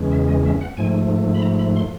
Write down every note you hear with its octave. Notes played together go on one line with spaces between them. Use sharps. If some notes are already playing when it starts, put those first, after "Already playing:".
Already playing: E2 C#3 E3 G#3 C#4
E5
D#5
E5
F#5
G#2 F3 A3 G#5
B5
A#5
B5
C6